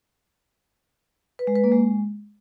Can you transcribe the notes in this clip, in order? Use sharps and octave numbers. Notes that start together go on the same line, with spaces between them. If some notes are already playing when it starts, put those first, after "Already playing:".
B4
G#3
B4
A#3
G#3